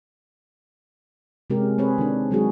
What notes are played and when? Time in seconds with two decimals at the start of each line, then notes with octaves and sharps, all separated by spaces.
1.50 C3 G#3 C#4 G4 A#4
1.78 C4 G#4 B4 C#5
1.98 D#3 D4
2.31 D#3 F#3 G#3 D#4 F#4 G#4